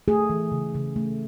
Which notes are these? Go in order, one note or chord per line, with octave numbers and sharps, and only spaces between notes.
A3 G#4
E3
C#3
C#3
A3